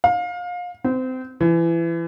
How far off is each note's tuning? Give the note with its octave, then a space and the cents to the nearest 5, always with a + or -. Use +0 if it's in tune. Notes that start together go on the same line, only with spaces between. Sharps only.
F5 +30
C4 -25
E3 +25